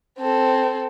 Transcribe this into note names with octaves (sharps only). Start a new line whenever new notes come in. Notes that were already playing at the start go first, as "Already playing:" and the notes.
C4 A4